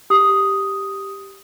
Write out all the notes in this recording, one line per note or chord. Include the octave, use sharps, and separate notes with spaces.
G4 D#6